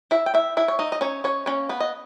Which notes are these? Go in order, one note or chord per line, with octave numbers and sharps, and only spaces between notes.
E3 E4 E5
G5
E4 E5
E3 E4 E5
C#5
D#4 D#5
D#5
C#4 D#4 C#5
C#4 C#5
A#3 C#4 C#5
B3 B4
D#5